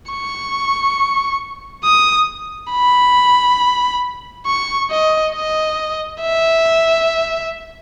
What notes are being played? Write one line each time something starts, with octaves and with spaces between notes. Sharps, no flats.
C#6
D#6
B5
C#6
D#5
D#5
E5